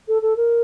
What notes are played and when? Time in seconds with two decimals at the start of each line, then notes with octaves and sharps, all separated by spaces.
0.08 A4
0.22 A4
0.37 A#4